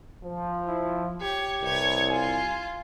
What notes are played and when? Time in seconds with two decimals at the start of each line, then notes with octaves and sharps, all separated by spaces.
0.23 F3
0.68 E4
1.21 G4 C#5
1.62 C2 B4 C#5
2.10 F4 G#5